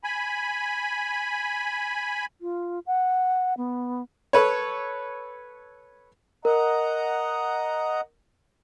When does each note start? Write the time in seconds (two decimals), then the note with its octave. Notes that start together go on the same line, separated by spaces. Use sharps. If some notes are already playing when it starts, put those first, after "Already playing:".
0.04 G#5 B5
2.41 F4
2.87 F#5
3.57 B3
4.33 A4 B4 C#5
6.45 A#4 D#5 F#5 A#5